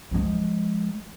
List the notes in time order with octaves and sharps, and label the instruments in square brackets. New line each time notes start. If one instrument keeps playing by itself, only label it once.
[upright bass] F3 G#3